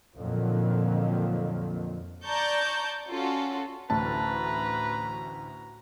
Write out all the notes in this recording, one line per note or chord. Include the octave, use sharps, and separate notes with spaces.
F2 A#2 D3 D#3 F#3 A#3
D5 A5 A#5 C#6 G6
C#4 F4 F#4 A4
A1 D2 A2 F#4 B4 A5 A#5